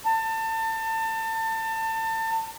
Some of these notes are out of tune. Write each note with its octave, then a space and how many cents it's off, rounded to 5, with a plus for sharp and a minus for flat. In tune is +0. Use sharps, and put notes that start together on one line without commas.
A5 +30